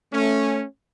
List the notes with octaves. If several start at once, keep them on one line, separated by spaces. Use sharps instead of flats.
A3 C#4